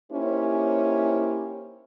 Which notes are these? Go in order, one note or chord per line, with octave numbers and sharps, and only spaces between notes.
A#3 C#4 D#4 E4 G4 C5